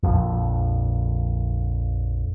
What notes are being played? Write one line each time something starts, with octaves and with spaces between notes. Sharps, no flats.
A#1 F2